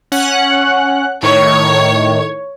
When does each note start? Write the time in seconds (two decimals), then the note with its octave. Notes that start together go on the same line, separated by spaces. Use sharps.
0.12 C#4 F#5 F#6
1.23 A2 D#3 C#5